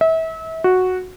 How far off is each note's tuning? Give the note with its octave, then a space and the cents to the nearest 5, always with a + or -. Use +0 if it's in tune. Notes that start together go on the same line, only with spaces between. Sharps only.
E5 -30
F#4 -5